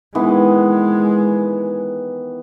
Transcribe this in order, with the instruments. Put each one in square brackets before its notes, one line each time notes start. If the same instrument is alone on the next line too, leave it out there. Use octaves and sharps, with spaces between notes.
[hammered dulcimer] D#3 E3 B3 [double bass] G#3